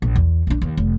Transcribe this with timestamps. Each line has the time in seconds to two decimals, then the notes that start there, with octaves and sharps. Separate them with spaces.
0.02 A#1
0.15 E2
0.47 A#1 D4
0.62 D#2
0.77 F1